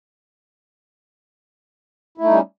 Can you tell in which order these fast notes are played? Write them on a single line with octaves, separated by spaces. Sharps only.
E4 A3 D#4 G3 C#4